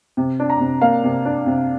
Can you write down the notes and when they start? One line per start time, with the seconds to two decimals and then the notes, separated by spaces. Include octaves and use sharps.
0.17 C3
0.40 D4
0.50 A#5
0.60 C3
0.81 A#3 F5
1.04 C3
1.25 D4
1.46 C3